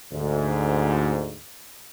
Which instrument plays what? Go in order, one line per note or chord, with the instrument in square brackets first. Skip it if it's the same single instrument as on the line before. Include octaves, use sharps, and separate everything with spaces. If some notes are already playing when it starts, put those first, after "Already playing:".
[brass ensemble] D2 G#2